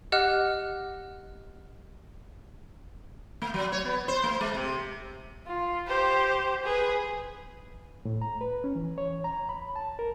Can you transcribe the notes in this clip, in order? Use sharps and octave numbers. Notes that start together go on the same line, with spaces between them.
G4 D#5 F#5 F6 F#6
A3
F#3
C#5
B3
C5
A3
G#3
C3
F4
G4 C5
G#4 B4
A2
A#5
B4
C#4
E3
C#5
A#5
B5
A5
A#4